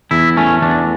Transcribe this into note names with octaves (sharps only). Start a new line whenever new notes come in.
E2 E4
A3 C#4
E2 D4